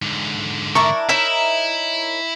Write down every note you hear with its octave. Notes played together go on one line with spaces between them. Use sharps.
G#2 D3
D4 E4 A#4 C#6
D#4 E4 A#4 C#5 E5